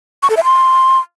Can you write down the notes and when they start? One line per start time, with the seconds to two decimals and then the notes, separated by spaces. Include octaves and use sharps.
0.23 C#6
0.30 A4
0.37 E5
0.44 C6